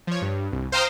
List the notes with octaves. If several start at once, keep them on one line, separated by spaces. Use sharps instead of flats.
F3 C#5
G2
C2
C5 F5 G5 A#5 D#6 F6